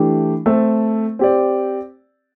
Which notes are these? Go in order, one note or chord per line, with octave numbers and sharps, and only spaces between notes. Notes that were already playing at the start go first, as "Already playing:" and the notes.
Already playing: E3 A3 D4 G4
A3 C4 A4
C4 G4 D5